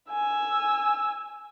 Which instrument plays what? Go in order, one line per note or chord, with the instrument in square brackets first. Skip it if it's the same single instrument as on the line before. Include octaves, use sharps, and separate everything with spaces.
[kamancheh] G#5 E6